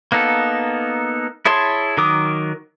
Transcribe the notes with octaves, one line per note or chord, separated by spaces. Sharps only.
A#3 B3 D#4 A4
E4 G#4 C#5 A5 C6
D#3 F#3 A#4 D6 D#6